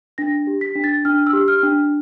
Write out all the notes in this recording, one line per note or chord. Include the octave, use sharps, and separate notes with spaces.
D4 A#6
G4
B6
D4
A6
D4 F6
E6
G4
F6
D4